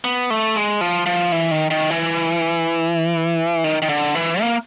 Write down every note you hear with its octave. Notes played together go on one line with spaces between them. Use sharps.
B3
A3
G#3
F3
F3
E3
D#3
D#3
E3
D#3
D#3
D3
E3
A#3